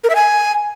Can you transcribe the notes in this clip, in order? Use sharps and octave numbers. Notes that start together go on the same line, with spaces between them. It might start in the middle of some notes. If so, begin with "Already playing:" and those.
A#4
E5
G#5